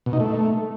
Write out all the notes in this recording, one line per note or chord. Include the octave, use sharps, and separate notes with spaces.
B2
D#4
A3